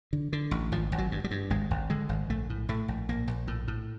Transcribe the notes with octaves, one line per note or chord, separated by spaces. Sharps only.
D3
D3
A1
G#1 F3
G#1
F#3
G2
G3
G2
G#1 G#3
G#1
D3 G#3
G#1
A#1 A3
A2
A2 A3
A#1
A#1 A#3
A#1
A2
A2